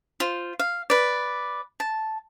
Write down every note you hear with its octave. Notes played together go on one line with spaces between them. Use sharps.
F4 C5
F5
B4 D5
A5